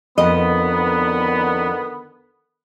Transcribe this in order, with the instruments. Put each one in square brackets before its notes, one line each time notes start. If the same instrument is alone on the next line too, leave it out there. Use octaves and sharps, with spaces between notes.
[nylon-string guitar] F2 D#5 [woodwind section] D3 D#3 B3